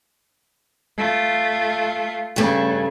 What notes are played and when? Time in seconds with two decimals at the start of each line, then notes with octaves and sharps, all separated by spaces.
0.97 A3 F4
2.36 G2 C#3 G3 A3